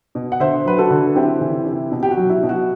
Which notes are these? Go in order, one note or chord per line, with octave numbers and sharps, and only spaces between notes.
B2
F#5
D3 C5 E5
F#3 B4
F#4 A4
D3
C4 E4 G4
E3
C3
B2
G4
F#4
F#3
E4
B2
F#4